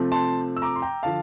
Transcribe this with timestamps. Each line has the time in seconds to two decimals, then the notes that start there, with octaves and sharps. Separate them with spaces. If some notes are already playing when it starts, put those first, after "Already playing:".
Already playing: C3 F3 A3 C4
0.12 A5 C6
0.57 E6
0.62 A#5 D6
0.76 C6
0.82 G5 A#5
1.03 D3 F3 F5 A5